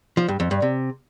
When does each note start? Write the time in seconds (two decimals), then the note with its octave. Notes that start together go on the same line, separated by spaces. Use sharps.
0.17 F3
0.28 G2
0.40 F2
0.51 G2
0.62 C3